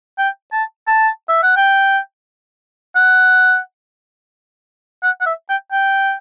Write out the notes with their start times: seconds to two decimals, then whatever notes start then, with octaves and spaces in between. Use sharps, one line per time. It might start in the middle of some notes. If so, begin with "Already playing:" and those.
0.18 G5
0.53 A5
0.88 A5
1.29 E5
1.43 F#5
1.57 G5
2.95 F#5
5.03 F#5
5.21 F#5
5.26 E5
5.49 G5
5.72 G5